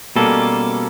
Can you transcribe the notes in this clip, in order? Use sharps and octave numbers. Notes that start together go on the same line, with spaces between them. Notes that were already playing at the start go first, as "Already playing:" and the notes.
B2 G3 A#3 C#4 A4